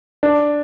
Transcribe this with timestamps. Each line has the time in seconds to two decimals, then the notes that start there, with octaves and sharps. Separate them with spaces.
0.23 D4